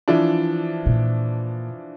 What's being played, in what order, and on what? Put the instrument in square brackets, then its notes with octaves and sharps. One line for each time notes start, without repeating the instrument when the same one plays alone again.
[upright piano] E3 F3 D4
[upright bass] A#2